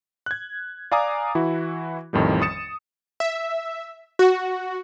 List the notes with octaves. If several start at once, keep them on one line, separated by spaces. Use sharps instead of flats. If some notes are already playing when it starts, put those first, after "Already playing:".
F#6 G#6
D5 F5 G#5 A#5 D6 D#6
E3 E4 F#4
A1 F2 A2 D#3 G3
D#6 A6 C#7 E7
E5
F#4